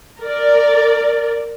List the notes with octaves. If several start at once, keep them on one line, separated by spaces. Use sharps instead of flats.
A#4 D5